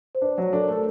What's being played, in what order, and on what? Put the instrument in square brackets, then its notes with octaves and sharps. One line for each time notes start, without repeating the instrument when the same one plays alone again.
[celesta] C5
[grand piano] D4 [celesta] B4
[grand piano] F#3
[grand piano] D4 [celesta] A4
[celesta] A#4
[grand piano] A3 [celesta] A4